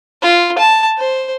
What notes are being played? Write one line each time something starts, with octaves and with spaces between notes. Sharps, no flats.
F4
A5
C5